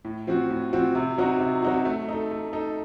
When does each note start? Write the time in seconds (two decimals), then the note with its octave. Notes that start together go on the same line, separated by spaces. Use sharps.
0.05 A2
0.27 F3 C4 F#4
0.50 A2
0.73 F3 C4 F#4
0.95 C3
1.18 F#3 C4 D#4 F#4
1.40 C3
1.62 F#3 C4 D#4 F#4
1.85 A3
2.09 D#4 A4
2.31 A3
2.53 D#4 A4